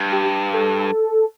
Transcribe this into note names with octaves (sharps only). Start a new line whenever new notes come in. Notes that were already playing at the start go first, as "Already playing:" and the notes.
Already playing: G2
G4
A4